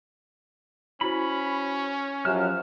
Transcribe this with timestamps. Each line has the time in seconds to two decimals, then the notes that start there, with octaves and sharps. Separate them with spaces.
1.01 C#4 E4 F#4 C5 B5
2.25 F#2 F3 G4 F6 F#6 E7